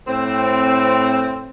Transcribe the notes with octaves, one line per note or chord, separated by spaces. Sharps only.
A2 C4